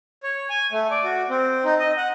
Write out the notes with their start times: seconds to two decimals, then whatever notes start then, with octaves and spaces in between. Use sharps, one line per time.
0.23 C#5
0.50 G#5
0.72 A3
0.91 D5
1.04 F#4
1.30 C4
1.64 D#4
1.80 D#5
1.97 F#5